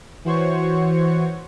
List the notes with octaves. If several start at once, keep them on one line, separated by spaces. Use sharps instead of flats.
E3 F#4 C5 C#5 C#6